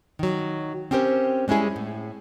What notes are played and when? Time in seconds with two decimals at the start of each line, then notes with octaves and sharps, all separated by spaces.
0.19 D#3 F#3
0.91 C4 C#4 G4 A#4 C5
1.48 G3 G#3 C#4 E4 G#4
1.76 A2